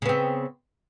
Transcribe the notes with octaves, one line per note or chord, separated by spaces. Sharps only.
C#3 B3 C4